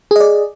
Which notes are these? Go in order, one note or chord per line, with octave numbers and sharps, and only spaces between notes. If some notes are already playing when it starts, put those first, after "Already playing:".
G#4 D5 D#5